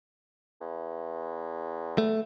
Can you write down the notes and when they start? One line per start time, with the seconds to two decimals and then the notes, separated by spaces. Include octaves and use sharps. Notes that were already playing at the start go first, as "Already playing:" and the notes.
0.61 E2
1.98 A3